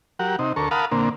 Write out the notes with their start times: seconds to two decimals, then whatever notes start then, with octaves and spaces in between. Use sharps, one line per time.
0.19 F#3 G4 A#4 F#5
0.39 C3 D#4
0.56 D2 A4 A#4 C#6
0.71 A#4 F5 F#5 A5 B5 D#6
0.92 A#2 D3 A#3 C4